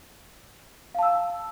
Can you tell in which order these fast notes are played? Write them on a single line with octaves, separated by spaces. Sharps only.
F5 A5 E6